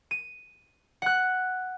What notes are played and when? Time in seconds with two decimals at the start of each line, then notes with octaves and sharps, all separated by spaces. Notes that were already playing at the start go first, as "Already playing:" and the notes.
0.11 D#7
1.02 F#5 F#6